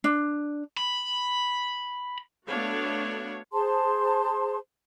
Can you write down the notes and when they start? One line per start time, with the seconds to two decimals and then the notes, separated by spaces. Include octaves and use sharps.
0.04 D4
0.77 B5
2.47 A3 B3 D4 F#4 C#5 F5
3.53 G#4 C5 A5 C6